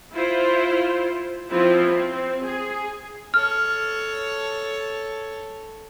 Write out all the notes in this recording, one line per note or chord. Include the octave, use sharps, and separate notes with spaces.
E4 F4 C5
F3 C4 E4 F4
C4
G#4
A4 C#5 F6